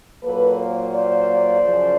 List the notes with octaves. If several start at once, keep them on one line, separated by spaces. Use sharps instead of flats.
A#2 F#3 A#3 A4 B4
A#4 C5
C5 D5
F#2 C#3 F3